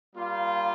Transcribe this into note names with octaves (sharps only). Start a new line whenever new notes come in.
G3 A#3 F4